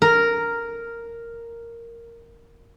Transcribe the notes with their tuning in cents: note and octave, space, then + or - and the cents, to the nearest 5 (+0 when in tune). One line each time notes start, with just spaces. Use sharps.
A#4 -5